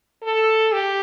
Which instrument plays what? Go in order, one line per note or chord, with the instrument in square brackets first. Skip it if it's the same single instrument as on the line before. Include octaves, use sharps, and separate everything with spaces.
[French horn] A4
G4